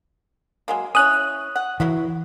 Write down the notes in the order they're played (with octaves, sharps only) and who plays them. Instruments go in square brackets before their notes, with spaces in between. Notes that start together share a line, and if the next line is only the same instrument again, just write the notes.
[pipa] F#3 G#3 A#3
[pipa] C#4 E4 C#5 [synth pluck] D#6 F#6
[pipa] F#5
[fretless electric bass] E3 [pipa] F#3 E4 F#4